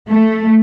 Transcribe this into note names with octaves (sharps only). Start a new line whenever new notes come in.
A3